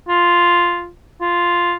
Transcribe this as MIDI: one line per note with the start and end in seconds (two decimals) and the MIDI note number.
0.08 0.89 65
1.21 1.74 65